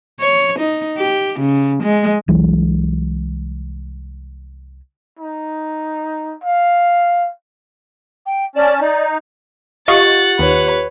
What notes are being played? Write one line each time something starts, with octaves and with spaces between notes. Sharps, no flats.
C#5
D#4
G4
C#3
G#3
C2 E3 F#3 G#3
D#4
F5
G5
C#4 D5 A5
D#4 D5
F4 G4 D#5 F5 F#5 C#6 A6
D#2 B4 C#5